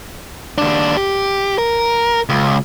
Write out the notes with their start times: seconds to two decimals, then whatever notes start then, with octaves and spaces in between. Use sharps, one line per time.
0.58 D#2 D4
0.97 G4
1.58 A#4
2.29 C#2